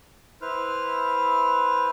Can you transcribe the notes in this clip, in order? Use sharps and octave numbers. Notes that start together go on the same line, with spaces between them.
E4 B4 C5 F6